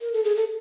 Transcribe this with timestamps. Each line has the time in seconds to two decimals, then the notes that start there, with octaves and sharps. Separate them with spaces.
0.01 A#4
0.13 A4
0.24 G#4
0.36 A4